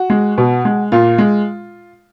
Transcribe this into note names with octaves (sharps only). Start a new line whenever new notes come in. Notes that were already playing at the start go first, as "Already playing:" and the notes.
Already playing: F#4
G#3
B2
G#3
A#2 F4
G#3